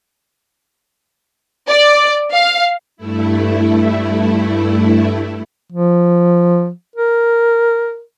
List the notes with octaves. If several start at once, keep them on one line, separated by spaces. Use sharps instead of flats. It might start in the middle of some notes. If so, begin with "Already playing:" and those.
D5
F5
G2 A3 E4
F3
A#4